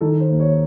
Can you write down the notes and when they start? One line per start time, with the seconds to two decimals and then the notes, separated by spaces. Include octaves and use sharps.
0.01 D#3 A4
0.20 C5
0.30 D#2
0.40 C#5